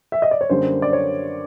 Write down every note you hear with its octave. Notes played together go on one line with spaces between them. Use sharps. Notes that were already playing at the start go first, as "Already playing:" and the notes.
E5
D#5
D5
C#5
F#2 D3 G3 A#3 C5
D5
C#5